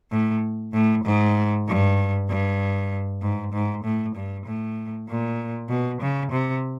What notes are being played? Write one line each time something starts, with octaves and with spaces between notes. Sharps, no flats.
A2
A2
G#2
G2
G2
G#2
G#2
A2
G2
A2
A#2
B2
C#3
C3